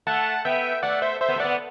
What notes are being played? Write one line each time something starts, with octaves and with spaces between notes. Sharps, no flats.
A3 F#5 A5
B3 E5 G5
A3 D5 F#5
C5 E5
C5 E5
B3
A3
B3 D5 F#5